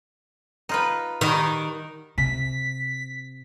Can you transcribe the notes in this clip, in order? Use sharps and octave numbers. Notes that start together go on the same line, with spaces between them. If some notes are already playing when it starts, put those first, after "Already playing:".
D#4 F4 B4
D#3 G3 F#4
C3 B6